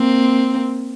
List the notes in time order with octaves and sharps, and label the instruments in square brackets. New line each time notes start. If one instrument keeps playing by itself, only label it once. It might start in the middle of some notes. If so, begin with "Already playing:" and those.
Already playing: [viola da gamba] A#3 C4